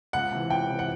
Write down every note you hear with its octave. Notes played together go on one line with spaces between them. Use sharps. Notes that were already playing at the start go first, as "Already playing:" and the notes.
C#2 F#5
C3 E3
C#2 G5
C3 E3
F#5